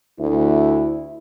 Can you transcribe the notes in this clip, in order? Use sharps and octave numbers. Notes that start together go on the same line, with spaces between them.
D2 E4